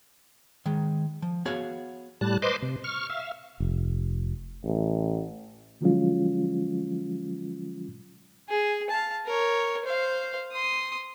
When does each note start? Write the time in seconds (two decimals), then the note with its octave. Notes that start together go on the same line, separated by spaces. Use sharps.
0.66 D#3 G#3
1.22 F3
1.45 B3 F#4 G#4 C#5 F5
2.21 A2 G3 A5 F#6
2.42 B4 C5 D#5 C6 D6
2.63 C3
2.84 C#6 F6
3.10 E5 F5
3.60 F1
4.64 A1
5.81 D3 F3 F#3 G#3 C#4 F4
8.48 G#4
8.90 F5 A5
9.26 A#4 C#5
9.85 C5 F5
10.51 C6 D#6